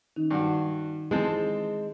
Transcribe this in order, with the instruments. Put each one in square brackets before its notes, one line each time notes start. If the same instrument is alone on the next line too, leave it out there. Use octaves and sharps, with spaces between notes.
[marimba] D#3 C#4 D#4
[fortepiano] G2 F#4
[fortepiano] E3 C4 A5 [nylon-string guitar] G#3